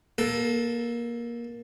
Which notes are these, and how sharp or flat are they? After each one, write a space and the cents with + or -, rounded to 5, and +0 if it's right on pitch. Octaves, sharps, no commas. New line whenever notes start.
A#3 +20 A4 +0